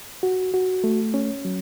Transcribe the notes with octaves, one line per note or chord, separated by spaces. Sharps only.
F#4
F#4
A3
C#4
F#3